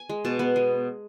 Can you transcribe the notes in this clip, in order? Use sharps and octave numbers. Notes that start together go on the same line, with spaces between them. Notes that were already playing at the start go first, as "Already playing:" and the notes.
Already playing: G#5
G#3
B2 A5
B3
G#3